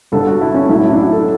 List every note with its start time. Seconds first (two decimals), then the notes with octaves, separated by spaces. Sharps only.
0.12 G1 G2 D3 A4
0.27 F#4
0.41 E4
0.54 C#4
0.69 B1 A2 F#3 E4
0.79 E4
0.88 D4 F#4
0.97 E4
1.12 A4